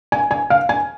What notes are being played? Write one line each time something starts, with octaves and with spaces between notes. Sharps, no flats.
G#5
G#5
F5
G#5